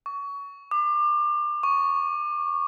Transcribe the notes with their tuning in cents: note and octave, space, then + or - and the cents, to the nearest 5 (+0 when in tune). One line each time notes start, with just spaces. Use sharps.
C#6 +25
D6 +30
C#6 +5